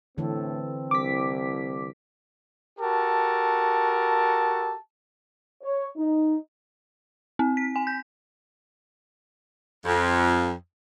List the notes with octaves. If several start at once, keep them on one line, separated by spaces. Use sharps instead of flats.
A2 D3 E3 C4 A4
C2 D6 B6
F#4 G4 A4 A#4 A5
C#5
D#4
C4
B6
G#5
G6
F2